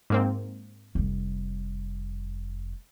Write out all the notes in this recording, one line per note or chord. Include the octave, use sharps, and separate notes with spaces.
G#2 A#3 C4
F1 G3